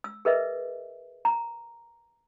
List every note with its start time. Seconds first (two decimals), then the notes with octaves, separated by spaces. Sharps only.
0.04 E6
0.25 G#4 A#4 B4 D#5 E5
1.25 A#5